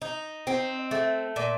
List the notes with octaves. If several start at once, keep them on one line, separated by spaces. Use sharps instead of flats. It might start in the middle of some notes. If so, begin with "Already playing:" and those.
D#4
C4
A3
A#2